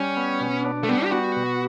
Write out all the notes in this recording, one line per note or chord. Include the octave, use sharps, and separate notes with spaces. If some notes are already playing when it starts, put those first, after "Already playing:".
Already playing: G3 C#4
B3
B2
D4
A3
G3 B3
G4
B3 F#4
B2